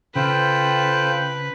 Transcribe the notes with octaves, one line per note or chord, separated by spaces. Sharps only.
C#3 F4 A4 B4 C5 G5 A5